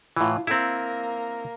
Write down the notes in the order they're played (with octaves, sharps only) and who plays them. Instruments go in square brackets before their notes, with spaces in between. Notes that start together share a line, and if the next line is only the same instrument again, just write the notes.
[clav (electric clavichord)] A2 E3 [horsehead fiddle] E4 F4
[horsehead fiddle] A#3 A#4 [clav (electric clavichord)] C4 E4